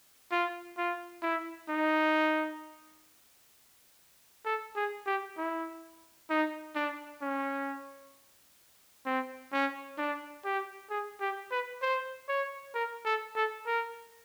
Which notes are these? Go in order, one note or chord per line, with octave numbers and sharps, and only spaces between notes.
F4
F4
E4
D#4
A4
G#4
G4
E4
D#4
D4
C#4
C4
C#4
D4
G4
G#4
G4
B4
C5
C#5
A#4
A4
A4
A#4